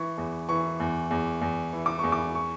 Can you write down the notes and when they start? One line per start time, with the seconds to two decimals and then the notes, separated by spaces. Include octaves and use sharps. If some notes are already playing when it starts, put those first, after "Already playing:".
Already playing: E3 C#6
0.18 E2
0.49 E3 C#6
0.80 E2
1.11 E2
1.42 E2
1.73 E3
1.86 D6
1.99 E2 C#6
2.12 D6
2.35 C#6